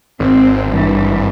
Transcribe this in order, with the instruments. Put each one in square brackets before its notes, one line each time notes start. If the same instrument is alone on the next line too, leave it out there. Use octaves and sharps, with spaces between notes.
[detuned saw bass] G#1 [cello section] C4
[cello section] G2 E3